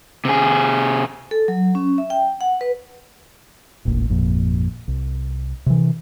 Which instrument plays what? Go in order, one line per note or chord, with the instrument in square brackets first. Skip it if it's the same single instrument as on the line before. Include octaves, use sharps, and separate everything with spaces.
[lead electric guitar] C3 G#4
[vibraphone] A4
F#3
C#4
E5
G5
F#5
B4
[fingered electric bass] E1 A1 A#2
G#1 F2 A#2
C2
C3 E3